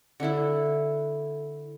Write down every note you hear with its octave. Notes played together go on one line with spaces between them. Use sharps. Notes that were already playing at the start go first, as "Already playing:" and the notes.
D3 D4 E4 A4